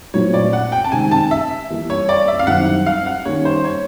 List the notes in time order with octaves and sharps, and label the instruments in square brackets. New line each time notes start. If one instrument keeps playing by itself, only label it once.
[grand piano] A#2 F#3 A3 C4 E4 [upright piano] C#5
[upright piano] D5
F#5
G5
A5
[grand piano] C3 D#3 G#3 [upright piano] G#5
[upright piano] A5
E5
[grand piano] E3 G3 A#3
[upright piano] C#5
D5
E5
F5
[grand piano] F#2 D#3 G3 C4 E4 [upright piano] F#5
[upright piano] F5
F#5
[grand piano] D#3 G3 A#3 C#4 [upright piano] C#5
[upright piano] C5
C#5